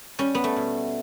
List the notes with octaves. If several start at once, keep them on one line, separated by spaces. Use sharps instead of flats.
G3 C#4
B3
A3
B2